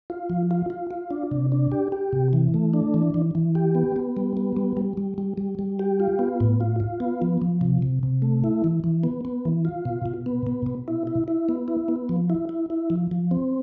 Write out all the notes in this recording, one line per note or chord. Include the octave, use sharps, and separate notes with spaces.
F4
F3
F4
F4
F4
D4
C3
D4
G4
G4
C3
E3
A3
D4
E3
E3
E3
G4
B3
B3
G3
B3
G3
G3
G3
G3
G3
G3
G4
F4
B3
A2
F4
F4
B3
F3
F3
C3
C3
C3
A3
E4
E3
E3
B3
B3
E3
F4
B2
B2
B3
B2
B2
E4
E4
E4
B3
E4
B3
F3
E4
E4
E4
F3
F3
C4